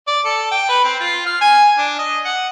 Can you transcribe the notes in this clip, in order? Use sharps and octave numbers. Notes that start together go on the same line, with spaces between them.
D5
A4
G5
B4
C4
F4
F6
G#5
D4
D#5
F#5